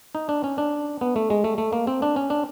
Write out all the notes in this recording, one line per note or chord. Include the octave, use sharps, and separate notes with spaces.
D#4
D4
C#4
D4
B3
A3
G#3
A3
A3
A#3
C4
D4
C#4
D4